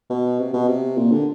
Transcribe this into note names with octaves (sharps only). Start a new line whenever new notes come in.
B2
C3
B2
C3
A#2
D3